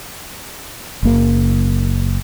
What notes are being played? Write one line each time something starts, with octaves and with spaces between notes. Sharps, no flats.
F#1 A#3